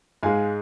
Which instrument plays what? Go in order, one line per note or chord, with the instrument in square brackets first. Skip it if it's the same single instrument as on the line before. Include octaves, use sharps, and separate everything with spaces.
[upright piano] G#2 G#3 F5 G#5